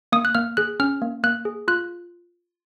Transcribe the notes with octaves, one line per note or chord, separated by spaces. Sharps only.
A#3 D#6
F#6
A#3 F6
G#4 F#6
C#4 F6
A#3
A#3 F#6
G#4
F4 F#6